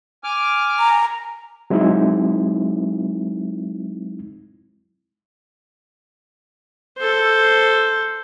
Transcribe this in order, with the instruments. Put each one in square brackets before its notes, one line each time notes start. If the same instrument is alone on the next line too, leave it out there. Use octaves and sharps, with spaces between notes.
[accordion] G#5 D6 F6
[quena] A#5
[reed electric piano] F#3 G#3 C4 D#4 E4
[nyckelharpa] A4 C5